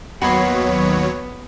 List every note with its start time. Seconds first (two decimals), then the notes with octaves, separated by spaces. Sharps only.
0.21 D#2 F#3 B3 F#4 C#5 B5 C6